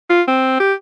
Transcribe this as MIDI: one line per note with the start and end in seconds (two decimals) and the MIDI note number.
0.10 0.22 65
0.28 0.58 60
0.60 0.73 67